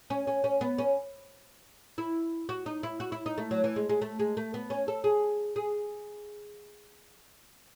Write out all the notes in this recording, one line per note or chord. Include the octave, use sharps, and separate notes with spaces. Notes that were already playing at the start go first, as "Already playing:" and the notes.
C#4
C#4
C#4
B3
C#4
E4
F#4
D#4
E4
F#4
E4
D#4
A3
F#3
E3
G#3
G#3
A3
G#3
A3
B3
C#4
A4
G#4
G#4